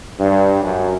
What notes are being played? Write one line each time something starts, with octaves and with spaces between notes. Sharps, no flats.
G2
F#2